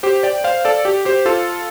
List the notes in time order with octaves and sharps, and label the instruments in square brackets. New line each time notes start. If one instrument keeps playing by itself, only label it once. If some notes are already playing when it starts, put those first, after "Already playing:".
[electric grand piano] G4 C5
D5 G5
C5 F5
A4 D5
G4
G4 C5
F4 A4